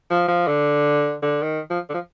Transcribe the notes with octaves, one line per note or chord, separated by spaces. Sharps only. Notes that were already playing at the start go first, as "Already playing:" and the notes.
F3
F3
D3
D3
D#3
F3
D3
F3